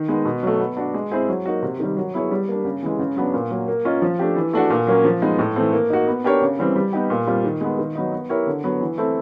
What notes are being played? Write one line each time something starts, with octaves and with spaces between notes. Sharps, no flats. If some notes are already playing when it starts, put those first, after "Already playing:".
Already playing: D#3
G#3 B3 D#4
B2
F#3 A3
B3
D4 F#4
G#3
C4 E4 G#4 C5
F#3
A#3 D#4 F#4
C3
D#3 G3
F#3
B3 E4 G#4 C#5
G3
A#3 D4
C#3
E3 G#3
C#3
F#3 B3 D4
A#2
F#3 A#3
A#3
C#4 F4 A#4 D#5
F3
A3 D4 G4
E3
A3 D4 F#4
A#2
F#3 A#3 C#4
F3
G#3 B3 D#4
A2
E3 A3 C4
A#3
D#4 F#4
B3
D4 G4 A#4 C#5
C#3
E3 G3 C4
G3
B3 D#4 G4
A#2
G3 C4 F4
D#3
G#3 B3
D#3
F#3 B3 D#4
B3
E4 G4 A#4 C#5
D3
F#3 B3
E3
A3 C4 E4 A4